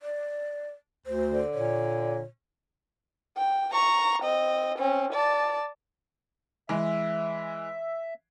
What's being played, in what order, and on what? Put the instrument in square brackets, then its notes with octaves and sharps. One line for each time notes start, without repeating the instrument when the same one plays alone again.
[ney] D5
[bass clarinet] D2 [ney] C5
[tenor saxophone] D3
[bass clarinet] A#2 [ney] C#5
[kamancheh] G5
A#5 C#6
C4 D#5
C4 C#4
D5 A5
[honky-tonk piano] E3 G#3 [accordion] E5